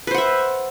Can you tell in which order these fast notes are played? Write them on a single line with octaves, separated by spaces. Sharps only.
B4 C5 F#5 E5